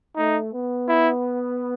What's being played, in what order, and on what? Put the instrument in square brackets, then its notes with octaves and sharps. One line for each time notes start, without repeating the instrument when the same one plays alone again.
[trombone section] A3 [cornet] D#4
[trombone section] B3
[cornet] E4